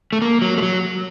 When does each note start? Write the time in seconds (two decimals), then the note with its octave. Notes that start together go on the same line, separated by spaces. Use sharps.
0.13 A3
0.22 A#3
0.42 F#3
0.58 A3
0.62 F#3